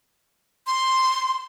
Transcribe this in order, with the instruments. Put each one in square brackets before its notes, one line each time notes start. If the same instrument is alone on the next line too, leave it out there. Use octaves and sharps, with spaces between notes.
[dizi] C6